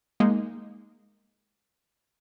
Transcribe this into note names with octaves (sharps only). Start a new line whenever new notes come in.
G#3 A#3 D#4